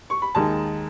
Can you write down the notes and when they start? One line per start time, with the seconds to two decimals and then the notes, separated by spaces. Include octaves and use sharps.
0.10 C#6
0.22 B5
0.35 D#2 D#3 G#3 D#4 A5